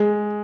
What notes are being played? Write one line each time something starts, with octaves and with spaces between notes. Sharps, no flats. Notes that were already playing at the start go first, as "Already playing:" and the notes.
Already playing: G#3